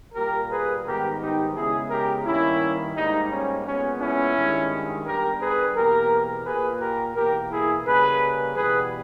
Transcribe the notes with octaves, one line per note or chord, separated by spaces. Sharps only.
A#2 G3 A#3 G4 A#4
G#4 B4
G#2 D#3 G3 B3 G4 A#4
D#4 G4
C#3 G#3 B3 E4 G#4
G4 A#4
G2 D#3 G3 A#3 C#4 E4
G#2 G3 A#3 D#4
C#4
A#2 G#3 B3 C#4
C#4 E4
G2 D#3 G#3
G2 G3 B3 G4 A#4
G#4 B4
E2 B2 A#3 G4 A#4
A#2 A#3 G#4 B4
G4 A#4
E2 B2 A#3 G4 A#4
E4 G#4
C#3 G3 A#3 G#4 B4
E2 B2 G3 B3 G#4 B4